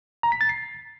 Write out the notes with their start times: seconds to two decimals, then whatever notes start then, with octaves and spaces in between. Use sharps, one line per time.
0.23 A#5
0.32 B6
0.41 A6
0.49 C7